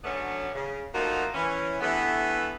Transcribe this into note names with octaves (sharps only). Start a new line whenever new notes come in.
D3 F#3 A3 B3 C#4 D4
C#3
F3 A3 A#3 D#4 F#4
E3 C#4
G2 E3 A3 B3